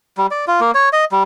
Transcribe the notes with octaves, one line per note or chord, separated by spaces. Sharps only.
G3
D5
F4
A#3
C#5
D#5
G3